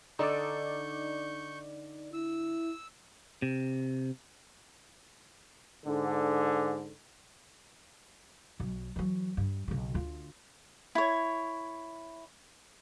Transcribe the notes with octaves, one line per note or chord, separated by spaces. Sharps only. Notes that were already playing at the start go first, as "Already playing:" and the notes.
D3 D4 D#4 A4 D5 C#6 G6
E4 E6
C3
G#2 D3
B1 F#3
E3 F#3
G2
B1 C#3
D2 F4
E4 C#5